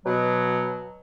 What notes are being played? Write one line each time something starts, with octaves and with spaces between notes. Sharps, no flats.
B2 F#3